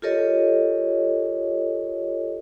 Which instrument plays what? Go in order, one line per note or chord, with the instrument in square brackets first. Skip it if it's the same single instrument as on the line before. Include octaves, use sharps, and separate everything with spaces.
[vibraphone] F4 G4 A4 A#4 C#5 D#5